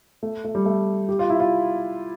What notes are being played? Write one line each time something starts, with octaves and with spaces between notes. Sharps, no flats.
A3
A3
G3
A3
G4
F4
E4
F4